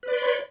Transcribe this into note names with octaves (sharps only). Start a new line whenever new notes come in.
B4 C#5 D5 B5 C6